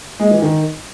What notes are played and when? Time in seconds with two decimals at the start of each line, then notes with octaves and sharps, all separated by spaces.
0.20 G#3
0.31 E3
0.42 D#3